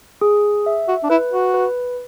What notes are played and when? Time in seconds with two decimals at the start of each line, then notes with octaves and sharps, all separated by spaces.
0.21 G#4
0.66 E5
0.88 F#4
1.03 D4
1.10 E4 B4
1.32 F#4
1.54 B4